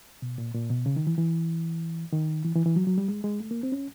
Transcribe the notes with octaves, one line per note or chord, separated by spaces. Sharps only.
B2
A#2
A#2
B2
C#3
D#3
E3
E3
D#3
E3
E3
E3
F#3
F#3
G3
G#3
G#3
A3
A#3
C4
C#4